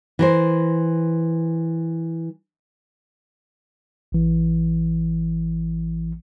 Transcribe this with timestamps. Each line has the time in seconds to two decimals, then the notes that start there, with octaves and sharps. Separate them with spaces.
0.19 E3 A#4 C5
4.12 A1 E3